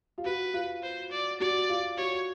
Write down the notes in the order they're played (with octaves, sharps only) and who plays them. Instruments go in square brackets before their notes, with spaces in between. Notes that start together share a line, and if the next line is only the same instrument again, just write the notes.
[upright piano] F4
[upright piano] F#4 [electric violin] B4
[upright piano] F4
[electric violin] C5
D5
[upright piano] F#4 [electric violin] D5
[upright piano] F4
[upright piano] F#4 [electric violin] C#5